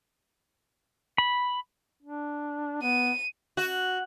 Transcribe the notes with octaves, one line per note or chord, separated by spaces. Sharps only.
B5
D4
B3 D#7
F#4